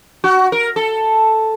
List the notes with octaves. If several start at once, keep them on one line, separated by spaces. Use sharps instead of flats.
F#4
A#4
A4